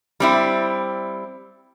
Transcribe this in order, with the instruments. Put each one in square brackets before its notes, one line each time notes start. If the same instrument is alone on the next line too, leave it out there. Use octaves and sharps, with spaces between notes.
[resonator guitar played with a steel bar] G3 C4 E4